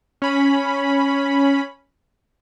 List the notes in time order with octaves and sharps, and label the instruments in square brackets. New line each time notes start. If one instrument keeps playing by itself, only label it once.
[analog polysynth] C#4 B5